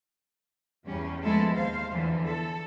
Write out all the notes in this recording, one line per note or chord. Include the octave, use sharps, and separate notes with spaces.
E2 G3 C#4
F3 G#3 B3 E4 A4
D#2 C5 F5
E2 D3 E3 F3
A4